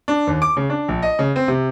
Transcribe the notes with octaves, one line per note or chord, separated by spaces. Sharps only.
D4
D#2
D6
C#3
D4
A#1
D#5
C#3
C4
C3